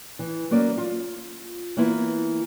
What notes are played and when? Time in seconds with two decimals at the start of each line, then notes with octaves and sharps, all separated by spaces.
0.19 E3
0.51 F#3 A#3 C#4 D5
0.78 F4
1.77 E3 A#3 B3 E4 F4